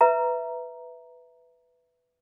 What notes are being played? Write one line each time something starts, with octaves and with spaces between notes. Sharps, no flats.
B4 E5 A#5